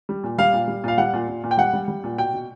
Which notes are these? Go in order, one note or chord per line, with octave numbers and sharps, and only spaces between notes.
G3
A#2
G3 F5
A#2
G3
A#2 F5
G3 F#5
A#2
A#2
A#2
G5
G3 F#5
G3
G3
A#2
B2 G5
B2